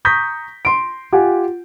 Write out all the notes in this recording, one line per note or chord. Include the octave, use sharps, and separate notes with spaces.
A#5 C#6 D#6 G6 A#6 B6
C6 D7
F4 G4 F#5 G#5